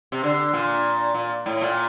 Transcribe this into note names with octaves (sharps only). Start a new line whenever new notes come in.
C3
D3
A#2
A#2
A2
A#2